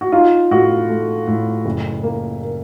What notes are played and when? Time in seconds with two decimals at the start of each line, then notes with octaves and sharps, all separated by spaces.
0.01 F#4
0.12 D#4 F4
0.51 A2 F#4
0.89 A3
1.27 A2
1.65 F#1
2.03 A#3
2.42 A#4